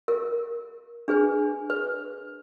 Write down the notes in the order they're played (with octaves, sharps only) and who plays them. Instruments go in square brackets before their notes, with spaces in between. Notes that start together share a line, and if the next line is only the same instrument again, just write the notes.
[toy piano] A#4
D4 G#4 B4 G#5
B4